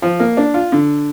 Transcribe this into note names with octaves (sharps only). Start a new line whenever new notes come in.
F3
A#3
D4
F4
D3